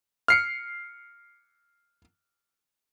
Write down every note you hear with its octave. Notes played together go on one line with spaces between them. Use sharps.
F6 C7 C#7